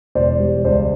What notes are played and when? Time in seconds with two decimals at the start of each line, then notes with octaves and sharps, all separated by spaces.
0.15 E1 C5 D5
0.39 G3
0.65 C#2 C5 D5